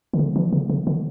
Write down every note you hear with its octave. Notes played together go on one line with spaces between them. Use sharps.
D3
C#3
E3
C#3
C#3
D3